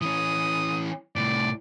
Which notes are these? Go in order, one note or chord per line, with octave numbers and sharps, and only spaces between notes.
E3 C#4 D#6
C2 A2 D5